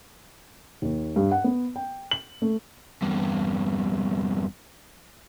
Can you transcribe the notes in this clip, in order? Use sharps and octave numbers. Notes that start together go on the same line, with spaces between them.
D#2
G2
F#5
B3
G5
F#7
A3
E2 G2